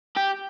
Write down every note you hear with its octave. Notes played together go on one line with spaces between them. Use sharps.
G4